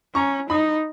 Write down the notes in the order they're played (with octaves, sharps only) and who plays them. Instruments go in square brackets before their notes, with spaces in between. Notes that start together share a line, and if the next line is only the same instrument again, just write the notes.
[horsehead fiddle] C#4 [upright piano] A#5 C#6
[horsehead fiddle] D#4 [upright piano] B5 D#6